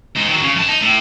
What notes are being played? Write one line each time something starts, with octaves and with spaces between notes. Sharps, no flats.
G#3 D#4
D#3 F#3
C#3
F#2 A5
D#4
A2